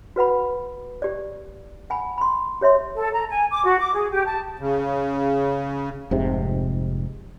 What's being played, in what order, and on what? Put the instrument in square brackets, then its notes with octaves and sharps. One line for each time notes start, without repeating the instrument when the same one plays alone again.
[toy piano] F#4 B4 F#5 B5
G4 D5
F#5 G#5 B5
B5 C6
G4 C#5 E5 C6
[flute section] A4
A#5
G#5
D6
F#4
D6
G#4
G4
A5
[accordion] C#3
[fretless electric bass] F1 G#2 C3